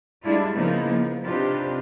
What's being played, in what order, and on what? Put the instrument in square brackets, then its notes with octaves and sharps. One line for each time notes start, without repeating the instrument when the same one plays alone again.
[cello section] G3 G#3 D4 E4 F4
C#3 F3 A#3 B3 D#4 E4
F3
C3 D4 D#4 F4 G4 B4